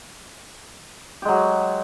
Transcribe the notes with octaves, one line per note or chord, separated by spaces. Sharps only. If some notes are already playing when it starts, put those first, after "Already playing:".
F#3 G#3 G4